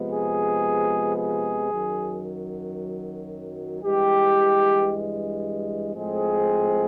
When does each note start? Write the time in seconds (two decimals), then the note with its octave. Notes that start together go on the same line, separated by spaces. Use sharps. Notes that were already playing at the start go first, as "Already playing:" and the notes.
Already playing: C3 F3 G#3 B3
0.12 G#4
1.17 G#4
1.70 F#2 D#3 F#3
3.82 G2 E3 G#3 G4
5.94 A2 F3 G#3 C4 G#4